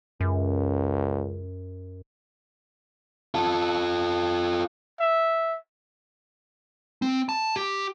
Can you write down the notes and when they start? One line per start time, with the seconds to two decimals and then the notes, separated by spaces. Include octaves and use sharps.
0.21 C#2 F#2
3.35 F4 A4
5.00 E5
7.02 C4
7.29 A5
7.56 G4